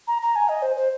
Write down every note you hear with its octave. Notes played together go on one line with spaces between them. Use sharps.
A#5
A#5
G#5
D#5
C5
C5